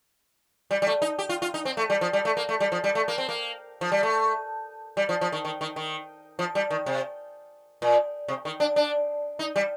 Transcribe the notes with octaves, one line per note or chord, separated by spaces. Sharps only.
G3
G3
A3
D#4
G4
F4
F4
D#4
C4
A3
G3
F3
G3
A3
A#3
A3
G3
F3
G3
A3
A#3
C4
A#3
F3
G3
A3
G3
F3
F3
D#3
D#3
D#3
D#3
F3
G3
D#3
C3
A#2
C3
D#3
D4
D4
D#4
G3